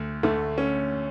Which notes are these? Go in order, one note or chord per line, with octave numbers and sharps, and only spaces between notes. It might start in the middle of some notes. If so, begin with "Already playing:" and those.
Already playing: D2 A3
D2 D3 A3
C#4